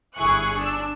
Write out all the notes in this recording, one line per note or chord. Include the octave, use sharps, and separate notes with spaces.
G1 E4 G#4 C#6 F#6
D4 E6